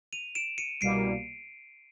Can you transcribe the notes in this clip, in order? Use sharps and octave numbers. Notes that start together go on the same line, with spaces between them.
D#7 F7
D7 E7
C#7 D#7
C2 B2 G3 A#3 C7 D7